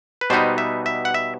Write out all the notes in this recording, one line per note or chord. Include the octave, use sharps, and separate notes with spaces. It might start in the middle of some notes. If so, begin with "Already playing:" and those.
B4
B2 G3 B3 D#4 C5
E5
E5
F#5
E5